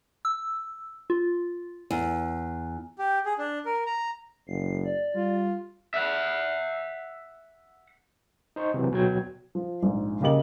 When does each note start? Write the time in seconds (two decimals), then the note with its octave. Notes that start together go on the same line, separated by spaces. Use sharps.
0.25 E6
1.10 F4
1.91 E2
2.99 G4
3.25 G#4
3.38 D4
3.65 A#4
3.86 A#5
4.47 F#1 C7
4.84 D5
5.15 G3 F4
5.94 E5 F#5
8.56 D#4 C5 D#5 C#6
8.74 C3 E3 F#3
8.91 D2 B2 F#3 G5 G#6
9.55 F3
9.83 A#1 G#2
10.21 C#3 A#3 G4 D#5 F#7